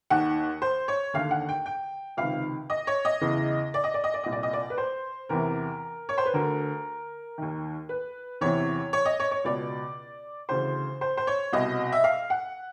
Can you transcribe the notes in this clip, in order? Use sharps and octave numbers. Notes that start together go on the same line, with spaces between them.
D#2 D#3 F#5
C5
C#5
D#2 D3 F5
F#5
G5
G5
C#2 C3 D#3 F5
D#5
C#5
D#5
E2 C#3 E3
D5
D#5
D5
D#5
D5
C2 A#2 D#5
D5
D#5
D5
B4
C5
E2 C3 E3 A#4
C#5
C5
B4
D2 D3 A#4
D#2 D#3
B4
E2 C3 E3 C#5
C#5
D#5
C#5
C#5
C#2 B2 D5
D2 C#3 E3 C5
C5
C5
C#5
C2 B2 D#5
E5
F5
F#5